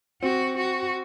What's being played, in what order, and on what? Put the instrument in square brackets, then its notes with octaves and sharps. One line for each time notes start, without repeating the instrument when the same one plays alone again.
[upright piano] C4 [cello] F#4
[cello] F#4